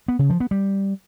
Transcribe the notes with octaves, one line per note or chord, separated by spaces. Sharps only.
B3
C#3
F3
B3
G3